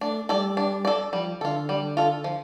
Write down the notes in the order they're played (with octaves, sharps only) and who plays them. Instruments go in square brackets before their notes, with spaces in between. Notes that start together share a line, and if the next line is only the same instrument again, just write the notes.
[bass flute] A3 [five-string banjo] D4
[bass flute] G3 [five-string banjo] A4 D5
[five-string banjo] D4
A4 D5
[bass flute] F3 [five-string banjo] G3
[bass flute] D3 [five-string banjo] F4 A4
[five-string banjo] G3
F4 A4
F3